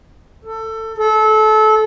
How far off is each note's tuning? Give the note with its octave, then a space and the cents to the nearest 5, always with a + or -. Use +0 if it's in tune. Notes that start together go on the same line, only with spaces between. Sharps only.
A4 +20
A4 -25